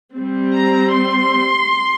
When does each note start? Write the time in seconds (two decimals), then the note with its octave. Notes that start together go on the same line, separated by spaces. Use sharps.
0.15 G3 C4
0.54 A#5
0.93 C6